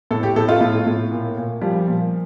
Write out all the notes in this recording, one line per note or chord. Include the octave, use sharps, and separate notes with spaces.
A2 A4
G4
A2 A4
F4
A2
A2
A#2
A#2
F3 G3
A#2